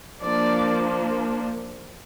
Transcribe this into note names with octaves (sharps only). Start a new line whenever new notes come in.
F3 A#3 D4 D5